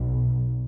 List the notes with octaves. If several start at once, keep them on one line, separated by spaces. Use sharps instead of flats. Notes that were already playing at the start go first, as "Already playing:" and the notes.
Already playing: B1 B2